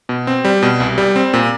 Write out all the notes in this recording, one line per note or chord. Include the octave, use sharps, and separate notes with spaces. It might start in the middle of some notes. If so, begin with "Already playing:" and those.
B2
C4
G3
B2
C2
G3
C4
A#2